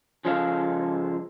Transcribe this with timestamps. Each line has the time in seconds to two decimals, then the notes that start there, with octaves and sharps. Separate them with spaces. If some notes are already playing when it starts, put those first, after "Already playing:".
0.25 C#3 F3 G#3 A4 F5